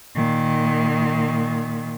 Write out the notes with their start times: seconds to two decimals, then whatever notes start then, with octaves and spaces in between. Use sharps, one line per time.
0.15 A#2 D#3